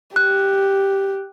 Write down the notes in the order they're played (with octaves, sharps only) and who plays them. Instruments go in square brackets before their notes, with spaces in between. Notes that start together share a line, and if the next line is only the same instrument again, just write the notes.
[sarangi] G4 [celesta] F#6